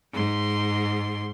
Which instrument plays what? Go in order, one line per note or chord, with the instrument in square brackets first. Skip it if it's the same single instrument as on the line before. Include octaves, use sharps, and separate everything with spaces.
[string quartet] G#2 C6